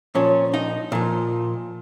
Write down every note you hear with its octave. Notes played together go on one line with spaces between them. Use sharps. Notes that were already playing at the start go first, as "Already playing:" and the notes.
A#2 F3 C#4 C#5
D#4 D#5
A#2 F3